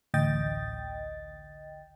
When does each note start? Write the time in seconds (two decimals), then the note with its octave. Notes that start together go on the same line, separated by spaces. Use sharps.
0.14 A1 D2 D#5 G5 A6